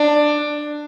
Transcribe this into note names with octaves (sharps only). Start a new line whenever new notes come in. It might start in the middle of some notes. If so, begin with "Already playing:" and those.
Already playing: D4